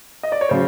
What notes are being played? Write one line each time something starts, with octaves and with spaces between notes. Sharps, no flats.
D#5
D5
C#5
C#3 F#3 C5